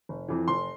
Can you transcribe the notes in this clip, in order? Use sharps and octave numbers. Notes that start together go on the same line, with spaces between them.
F1
F2 E3
F1 C6